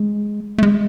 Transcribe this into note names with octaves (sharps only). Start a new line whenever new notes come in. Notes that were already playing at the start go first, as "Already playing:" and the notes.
Already playing: G#3
A3
G#3